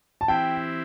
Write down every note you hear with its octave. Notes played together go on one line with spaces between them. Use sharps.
A5
E3 C4 E4 G4 G5